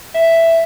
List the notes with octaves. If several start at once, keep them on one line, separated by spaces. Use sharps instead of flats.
E5